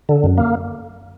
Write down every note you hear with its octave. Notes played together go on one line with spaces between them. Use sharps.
D3
F#2
A#3